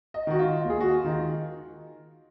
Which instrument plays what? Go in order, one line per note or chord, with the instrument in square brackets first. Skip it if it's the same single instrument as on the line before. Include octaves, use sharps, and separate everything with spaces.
[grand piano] D#5
D#3 F#4
F4
D#2 G#4
F#4
F4
D#3